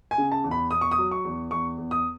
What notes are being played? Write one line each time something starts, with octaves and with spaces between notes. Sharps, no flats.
G#5
C#3
A5
E2
B5
E2 D#6
C#6
D#6
F#3
C#6
E2
E2 C#6
E2
D#6